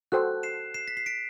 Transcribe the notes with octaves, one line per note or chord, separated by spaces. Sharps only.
F#4 A4 C5 G5 F#6
C7 E7
C7 E7
B6
C7
B6 D7